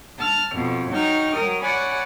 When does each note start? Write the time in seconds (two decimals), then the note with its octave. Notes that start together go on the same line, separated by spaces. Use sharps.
0.19 A5 F6
0.54 F2 B2
0.91 F#3 D#4 G5 C#6 F6
1.34 F#3 A#4 D#6
1.63 C#5 D5 F#5 G#5 B5